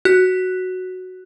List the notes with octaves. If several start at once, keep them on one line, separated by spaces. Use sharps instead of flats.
F#4 F#6